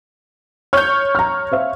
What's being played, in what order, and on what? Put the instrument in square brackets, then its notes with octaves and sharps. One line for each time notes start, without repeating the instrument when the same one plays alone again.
[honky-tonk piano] C#5 G6 [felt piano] F6
[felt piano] A#5 F6
C5 E5 F5